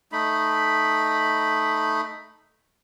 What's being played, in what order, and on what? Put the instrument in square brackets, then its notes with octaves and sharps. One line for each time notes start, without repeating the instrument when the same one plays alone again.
[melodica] A3 D#4 B5